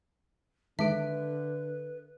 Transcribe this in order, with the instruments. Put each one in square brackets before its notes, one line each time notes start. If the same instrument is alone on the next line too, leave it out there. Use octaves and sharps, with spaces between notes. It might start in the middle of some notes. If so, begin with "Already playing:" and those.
[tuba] D3 [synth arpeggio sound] D#3 G#3 D7 [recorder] B4 [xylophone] E5